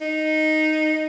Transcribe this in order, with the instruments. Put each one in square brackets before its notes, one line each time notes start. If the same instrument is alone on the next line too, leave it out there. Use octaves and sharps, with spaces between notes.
[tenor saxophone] D#4